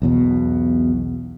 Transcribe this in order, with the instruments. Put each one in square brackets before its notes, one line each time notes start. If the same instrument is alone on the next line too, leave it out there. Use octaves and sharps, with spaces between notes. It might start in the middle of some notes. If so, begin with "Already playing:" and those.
[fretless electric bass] B1 E2 B2